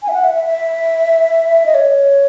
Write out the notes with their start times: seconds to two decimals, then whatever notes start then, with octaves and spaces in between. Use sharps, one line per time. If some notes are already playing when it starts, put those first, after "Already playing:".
0.03 G#5
0.08 E5
0.13 F#5
0.24 E5
0.35 E5
0.46 E5
1.66 D#5
1.75 C#5